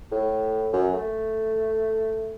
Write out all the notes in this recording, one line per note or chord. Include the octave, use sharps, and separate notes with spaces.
A2
F#2
A3